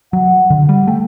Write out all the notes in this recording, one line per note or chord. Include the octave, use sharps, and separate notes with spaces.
F#3 F#5
D3
G3 F#5
A3 G5